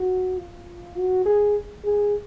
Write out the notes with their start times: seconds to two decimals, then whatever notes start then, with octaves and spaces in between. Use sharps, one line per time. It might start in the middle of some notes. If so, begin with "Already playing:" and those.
Already playing: F#4
0.38 F4
0.96 F#4
1.26 G#4
1.84 G#4